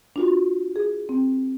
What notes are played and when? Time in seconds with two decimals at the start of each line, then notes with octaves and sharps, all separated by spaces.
0.16 D4 F4 F#4
0.76 G#4
1.09 C4